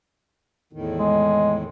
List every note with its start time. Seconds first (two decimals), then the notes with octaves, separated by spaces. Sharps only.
0.73 E2 A2 D#3
0.99 G#3